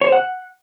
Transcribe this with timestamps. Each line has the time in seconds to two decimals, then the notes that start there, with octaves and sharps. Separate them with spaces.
0.01 C#5
0.07 C5
0.12 F#5